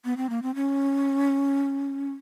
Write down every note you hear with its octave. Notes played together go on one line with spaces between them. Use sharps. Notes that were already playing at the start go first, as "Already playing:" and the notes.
B3
C4
A#3
C4
C#4